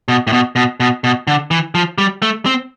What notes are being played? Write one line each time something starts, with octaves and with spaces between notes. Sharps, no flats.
B2
A2
B2
B2
B2
B2
D3
E3
F3
G3
A3
C4